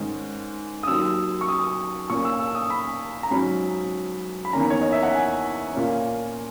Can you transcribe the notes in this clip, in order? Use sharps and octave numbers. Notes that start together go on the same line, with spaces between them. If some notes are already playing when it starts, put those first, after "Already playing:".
Already playing: G#2 D#3 G#3 C#4
D#6
D#2 D#3 F#3 E6
C#6
D#6
A#2 A#3 C#4 C#6
E6
E6
D#6
B5
A#5
G#2 F#3 C#4 B5
B5
E2 D#3 A#3 C#4 A#5
C#5
D#5
E5
F#5
G#5
A#2 A#3 C#4